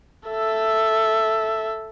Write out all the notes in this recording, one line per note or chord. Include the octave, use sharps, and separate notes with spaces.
A4 E5